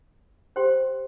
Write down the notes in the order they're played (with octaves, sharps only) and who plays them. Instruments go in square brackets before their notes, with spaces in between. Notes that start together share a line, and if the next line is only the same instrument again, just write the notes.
[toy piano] G4 C5 G5 C6